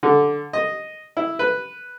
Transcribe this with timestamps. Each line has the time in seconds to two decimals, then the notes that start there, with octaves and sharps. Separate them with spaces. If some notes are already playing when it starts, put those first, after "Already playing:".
0.03 D3
0.53 D#5
1.17 E4
1.39 B4